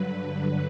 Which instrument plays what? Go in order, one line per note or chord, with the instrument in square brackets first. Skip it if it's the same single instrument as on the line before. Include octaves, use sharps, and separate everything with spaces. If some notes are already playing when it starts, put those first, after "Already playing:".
Already playing: [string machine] G2 D3 F#3 B4
B4